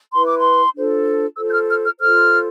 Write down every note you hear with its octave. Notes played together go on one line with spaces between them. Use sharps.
E4 B4 C6
D6
C6
D4 F4 A4 C5
F4 A4 C5 E6
G6
F6
F6
F6
F4 A4 C5 F6